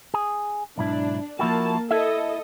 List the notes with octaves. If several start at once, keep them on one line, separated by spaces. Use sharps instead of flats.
G#4
B1 G#2 D4 E4
F3 A#3 E4 F#4 A5
E4 A4 D#5 E5